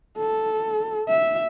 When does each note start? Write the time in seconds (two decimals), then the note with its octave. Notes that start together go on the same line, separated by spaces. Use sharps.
0.18 A4
1.08 E5